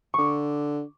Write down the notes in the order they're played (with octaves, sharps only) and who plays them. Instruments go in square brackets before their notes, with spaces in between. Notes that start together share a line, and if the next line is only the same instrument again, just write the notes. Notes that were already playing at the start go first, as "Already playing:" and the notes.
[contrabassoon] D3 [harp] C#6 D6